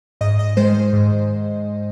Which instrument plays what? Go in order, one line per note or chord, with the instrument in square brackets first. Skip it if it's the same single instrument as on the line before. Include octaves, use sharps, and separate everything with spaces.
[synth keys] G#2 D#5
D#5
D#3 G#3 C5
G#2